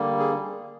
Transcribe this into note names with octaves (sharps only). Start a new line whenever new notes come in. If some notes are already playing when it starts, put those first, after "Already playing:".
Already playing: D3 G3 A#3
G#4